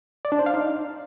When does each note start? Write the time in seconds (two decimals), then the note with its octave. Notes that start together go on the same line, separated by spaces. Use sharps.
0.25 D5
0.32 D4
0.39 C5
0.46 F5
0.54 D#4